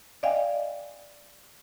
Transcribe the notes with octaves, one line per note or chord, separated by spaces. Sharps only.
D5 D#5 F5 G5 G#5